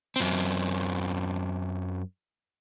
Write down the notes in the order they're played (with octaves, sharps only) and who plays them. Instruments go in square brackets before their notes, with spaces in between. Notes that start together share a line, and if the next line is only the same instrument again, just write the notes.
[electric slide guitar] F#2 C4